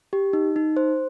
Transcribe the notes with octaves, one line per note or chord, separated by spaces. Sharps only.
G4
D#4
D#4
C5